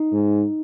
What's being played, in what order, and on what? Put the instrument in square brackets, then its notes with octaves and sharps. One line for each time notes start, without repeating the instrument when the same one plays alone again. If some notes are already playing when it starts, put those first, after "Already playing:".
Already playing: [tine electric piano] D#4
[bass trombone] G#2